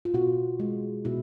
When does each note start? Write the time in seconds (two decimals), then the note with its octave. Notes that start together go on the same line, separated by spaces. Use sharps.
0.05 F4
0.14 B2 F#4
0.60 G#3
1.05 B2 E4